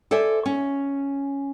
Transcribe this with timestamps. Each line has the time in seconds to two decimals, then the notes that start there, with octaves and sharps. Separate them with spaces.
0.11 A4 C5 D5 E5 G#5
0.46 C#4